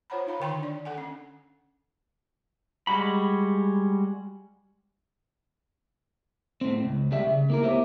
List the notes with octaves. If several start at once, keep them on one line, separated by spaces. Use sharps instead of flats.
F4 C5 C#5 F#5 A#5 B5
D#4 F5 A#5 B5
D3 D#3 G5 C6 C#6
D4 D5
A4 F#5 G#5
C#4
G3 G#3 F#4 B5
A2 C4
C#2
C#2 G3 G4 E5
C#3
A#3 E4 A#4
D2 B3 G4 C5 C#5 E5